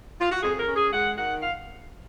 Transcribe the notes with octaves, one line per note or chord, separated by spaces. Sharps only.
F4
F#4
F2 G#4
A#4
C#4
G#4
G#3 F#5
D#3 F#5
F5